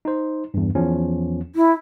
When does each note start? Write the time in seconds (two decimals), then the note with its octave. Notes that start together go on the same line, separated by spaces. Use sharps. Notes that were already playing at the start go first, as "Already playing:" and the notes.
0.05 D#4 C5
0.54 E2 G2
0.75 E2 F3 C#4
1.55 E4